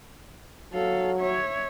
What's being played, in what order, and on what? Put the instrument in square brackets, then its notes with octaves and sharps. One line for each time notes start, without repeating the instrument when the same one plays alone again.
[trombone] F#3 [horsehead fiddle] A4 F5
[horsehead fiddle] C#5 E5